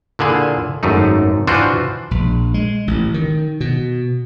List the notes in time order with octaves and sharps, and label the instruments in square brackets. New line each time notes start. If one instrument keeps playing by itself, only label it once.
[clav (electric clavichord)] A#2 D3 E4 G#4
G#1 F#2 A3 D#4
E3 D4 F4 F#4 C5
[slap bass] A#1
G#3
A1
D#3
B2